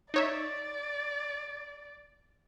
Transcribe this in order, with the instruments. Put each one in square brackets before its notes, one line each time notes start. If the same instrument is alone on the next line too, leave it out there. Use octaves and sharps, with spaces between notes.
[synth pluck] D#4 C#5 E5 [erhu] D5